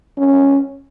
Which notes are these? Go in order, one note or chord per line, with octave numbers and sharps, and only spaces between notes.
C#4